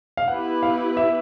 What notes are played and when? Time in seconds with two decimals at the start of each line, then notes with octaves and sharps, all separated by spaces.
0.17 F5
0.28 B3 E4 G4 B4 F#5
0.63 F5
0.97 E5